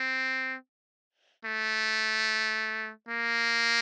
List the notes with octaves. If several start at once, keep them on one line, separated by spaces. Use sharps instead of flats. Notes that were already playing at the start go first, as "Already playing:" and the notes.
Already playing: C4
A3
A#3